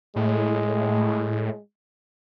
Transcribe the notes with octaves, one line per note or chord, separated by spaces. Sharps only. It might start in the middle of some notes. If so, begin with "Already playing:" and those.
A2 G#3